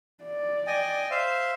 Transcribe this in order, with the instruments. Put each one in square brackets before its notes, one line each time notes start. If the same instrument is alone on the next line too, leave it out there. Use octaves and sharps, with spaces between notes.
[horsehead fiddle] D5
[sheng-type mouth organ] D#5 G5 G#5
C5 E5 F5